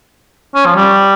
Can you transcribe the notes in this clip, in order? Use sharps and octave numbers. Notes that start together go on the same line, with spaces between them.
C#4
F3
G3